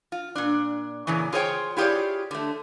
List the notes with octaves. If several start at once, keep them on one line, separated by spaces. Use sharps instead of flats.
F4
A#2 D4
A#2 C#3 E3
F4 G#4 C5 C#5 G5
E4 F4 G4 G#4 C#5 D5
D3 A3